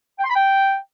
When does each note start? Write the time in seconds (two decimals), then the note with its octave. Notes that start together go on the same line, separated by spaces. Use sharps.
0.19 G5
0.24 C6
0.30 B5
0.35 G5